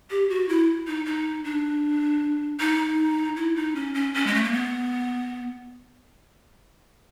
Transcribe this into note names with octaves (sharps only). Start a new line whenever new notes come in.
G4
F#4
E4
D#4
D#4
D4
D#4
E4
D#4
C#4
C#4
C#4
G#3
A3
A#3
B3